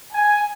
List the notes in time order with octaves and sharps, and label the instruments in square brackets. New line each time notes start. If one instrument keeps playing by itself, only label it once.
[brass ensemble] G#5